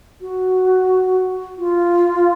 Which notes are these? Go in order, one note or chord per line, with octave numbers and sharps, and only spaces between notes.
F#4
F4